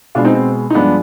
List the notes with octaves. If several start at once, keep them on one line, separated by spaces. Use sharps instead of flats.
B2 G#3 B3 D4 F4
C4 D#4
C4
D#4
G2 F3 G#3 B3 D4